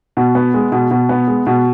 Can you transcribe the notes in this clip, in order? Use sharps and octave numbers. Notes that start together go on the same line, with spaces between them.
B2
B3
G#3
B2
B2
B3
G#3
B2